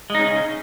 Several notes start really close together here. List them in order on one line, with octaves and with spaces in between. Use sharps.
G#3 D#4 C#4 C#3